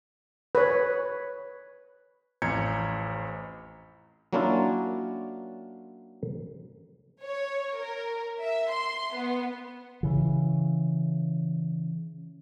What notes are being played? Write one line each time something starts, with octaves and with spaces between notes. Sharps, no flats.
B4 C#5
A1 F2 A#5 G6 G#6 C#7
F#3 A#3 C#4 D4 E4 F4
C#5
A#4
E5
C6
B3
C#3 E3